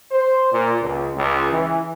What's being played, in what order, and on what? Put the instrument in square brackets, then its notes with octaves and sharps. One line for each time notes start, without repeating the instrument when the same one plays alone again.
[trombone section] C5
A#2
C#2
C#2
E3